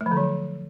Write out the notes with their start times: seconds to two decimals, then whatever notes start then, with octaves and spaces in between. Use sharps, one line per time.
0.01 A3
0.06 F3
0.11 D3
0.17 F#3